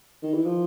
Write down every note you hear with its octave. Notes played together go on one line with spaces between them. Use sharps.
D#3
E3
F3